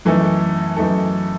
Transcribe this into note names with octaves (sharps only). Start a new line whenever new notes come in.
F#2 E3 A3 D#4 A4
F#2 E3 A3 D#4 A4